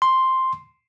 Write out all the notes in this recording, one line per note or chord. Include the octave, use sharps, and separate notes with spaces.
C6